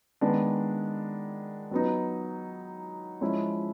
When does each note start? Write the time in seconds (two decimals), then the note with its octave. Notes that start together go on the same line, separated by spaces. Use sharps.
0.21 D#3 G#3 B3 D4
1.71 F#3 B3 D#4
3.21 F3 G#3 C#4 E4